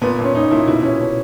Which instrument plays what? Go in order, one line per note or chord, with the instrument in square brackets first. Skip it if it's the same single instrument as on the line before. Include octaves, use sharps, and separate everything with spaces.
[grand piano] A#2 B3
A#2
C#4
A#2 D#4
A#2 E4
B2 E4
B2 C#4
B2 C#4